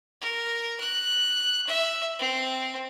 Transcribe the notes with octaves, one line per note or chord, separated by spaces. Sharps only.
A#4
F#6
E5
C4